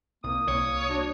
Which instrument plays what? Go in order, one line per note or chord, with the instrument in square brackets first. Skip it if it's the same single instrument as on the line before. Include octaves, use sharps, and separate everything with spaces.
[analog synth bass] C2 [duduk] A#3 [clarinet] D#6
[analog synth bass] C2 [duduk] A#3 [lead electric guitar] C#5
[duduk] D4 [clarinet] F#4